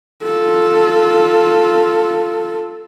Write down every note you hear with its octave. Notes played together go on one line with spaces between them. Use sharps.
F4 A4